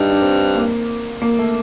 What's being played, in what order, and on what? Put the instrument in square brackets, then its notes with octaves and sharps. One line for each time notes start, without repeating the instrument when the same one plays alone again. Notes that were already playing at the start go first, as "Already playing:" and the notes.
Already playing: [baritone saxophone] G2 [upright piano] D4 D#4
[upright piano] D4
C4
A#3
A#3
A3